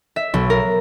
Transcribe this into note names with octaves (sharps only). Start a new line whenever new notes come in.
E5
B1
A#4